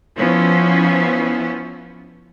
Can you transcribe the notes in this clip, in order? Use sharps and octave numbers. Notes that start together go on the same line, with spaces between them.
F3 B3 C#4 E4